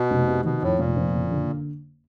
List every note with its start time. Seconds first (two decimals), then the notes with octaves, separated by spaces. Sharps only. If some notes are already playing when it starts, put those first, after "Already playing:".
Already playing: B2
0.11 F1
0.27 C3
0.45 B2 D#3
0.62 F2 A2
0.79 F1 A#2
0.96 F2
1.14 F#1
1.31 D3